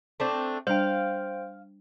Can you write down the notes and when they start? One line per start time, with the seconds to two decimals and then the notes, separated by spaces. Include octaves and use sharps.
0.20 A3 C4 D4
0.67 G3 D4 C5 F5 G5